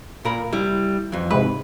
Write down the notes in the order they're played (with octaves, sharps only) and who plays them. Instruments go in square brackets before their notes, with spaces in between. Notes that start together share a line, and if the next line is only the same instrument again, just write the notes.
[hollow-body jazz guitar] A#2 A#4 B5
G3 E4
F2 E3
[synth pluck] G#2 C3 [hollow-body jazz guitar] B4